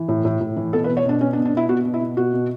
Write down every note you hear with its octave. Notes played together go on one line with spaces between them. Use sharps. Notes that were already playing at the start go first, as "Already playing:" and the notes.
Already playing: E3
A2
A2
A2
E3
B2 A4
B4
B2
C#5
B2 D4
B2 C#4
D4
B2
D4
B2 E4
B2 F#4
B2
E4
B2
B2 F#4
B2